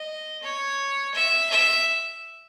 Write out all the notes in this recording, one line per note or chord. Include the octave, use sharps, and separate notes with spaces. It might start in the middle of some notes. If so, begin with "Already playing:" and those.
Already playing: D#5
C#5
E5
E5